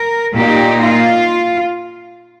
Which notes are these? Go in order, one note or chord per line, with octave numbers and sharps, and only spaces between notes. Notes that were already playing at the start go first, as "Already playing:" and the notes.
Already playing: A#4
A#2 A#3 D#4 G4
F4